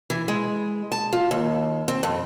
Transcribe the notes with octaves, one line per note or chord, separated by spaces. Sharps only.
E3
G#3
A5
F4
D#2
C4
F2